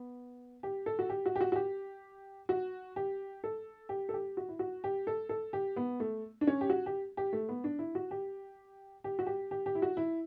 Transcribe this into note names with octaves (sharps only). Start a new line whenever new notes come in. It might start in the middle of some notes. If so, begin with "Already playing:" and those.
Already playing: B3
G4
A4
F#4
G4
F#4
G4
F#4
F#4
G4
F#4
G4
A4
G4
A4
G4
F#4
E4
F#4
G4
A4
A4
G4
B3
A3
D4
C#4
G4
F#4
G4
G4
A3
B3
D4
E4
F#4
G4
G4
F#4
G4
G4
G4
E4
F#4
E4